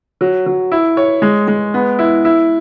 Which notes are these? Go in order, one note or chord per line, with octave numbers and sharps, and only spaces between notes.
F#3
F#3
E4
C#5
G#3
G#3
B3
E4
E4